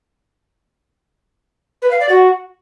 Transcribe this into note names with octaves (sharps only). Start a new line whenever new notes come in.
B4
F5
D5
F#4